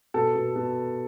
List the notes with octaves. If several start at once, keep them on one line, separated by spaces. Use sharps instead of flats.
B2 A4
B2
B2